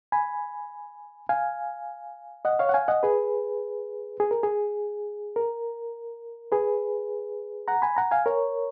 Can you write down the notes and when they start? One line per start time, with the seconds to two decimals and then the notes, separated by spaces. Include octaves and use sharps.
0.12 G#5 B5
1.29 F5 G#5
2.45 D#5 F#5
2.59 C#5 F5
2.69 F#5
2.74 F5 G#5
2.88 D#5 F#5
3.03 G#4 B4
4.20 G#4
4.31 A#4
4.43 G#4
5.36 A#4
6.52 G#4 B4
7.68 F#5 A#5
7.82 G#5 B5
7.97 F#5 A#5
8.11 F5 G#5
8.26 A#4 C#5